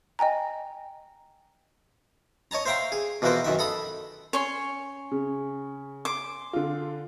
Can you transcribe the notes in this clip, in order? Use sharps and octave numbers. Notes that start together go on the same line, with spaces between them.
D#5 G5 G#5 A#5
C#5 D#5 A5 A#5
C5 E5 F5 G5 A#5 C6
G#4
B2 E3 F3 B3 A#4 C5
F#2 D#3 E5
A4 B5 D#6
C#4 C#5 C6
C#3
C6 D6
D3 F4